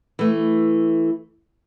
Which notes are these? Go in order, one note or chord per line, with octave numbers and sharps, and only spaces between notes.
E3 A3